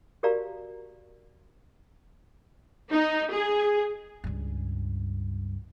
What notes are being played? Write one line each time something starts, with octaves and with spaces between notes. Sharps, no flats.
F#4 G4 A#4 D5 F5 A#5
D#4
G#4
C#2 G2